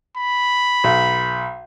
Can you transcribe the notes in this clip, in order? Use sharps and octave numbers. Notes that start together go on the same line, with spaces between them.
B5
B1